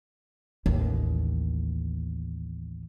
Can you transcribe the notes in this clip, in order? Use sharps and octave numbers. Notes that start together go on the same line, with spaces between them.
A1 D#2